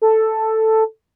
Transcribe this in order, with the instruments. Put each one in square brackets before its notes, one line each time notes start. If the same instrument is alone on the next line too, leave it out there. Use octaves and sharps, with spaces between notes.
[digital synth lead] A4